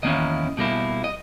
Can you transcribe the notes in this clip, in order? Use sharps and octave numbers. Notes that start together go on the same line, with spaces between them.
E2 D#3 A#3 C#4 E4 D#5
B2 G3 A#3 E4
D#5